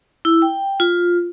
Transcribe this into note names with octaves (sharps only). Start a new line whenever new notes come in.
E4
G5
F4